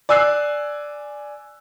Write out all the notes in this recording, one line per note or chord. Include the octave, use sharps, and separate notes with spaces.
D5 G#5 E6 F#6 C7